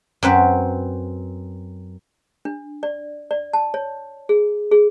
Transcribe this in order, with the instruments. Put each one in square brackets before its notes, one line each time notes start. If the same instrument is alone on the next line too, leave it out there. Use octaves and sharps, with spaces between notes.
[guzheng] F#2 C4 B4
[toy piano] D4
D5
D5
A5
C#5
G#4
G#4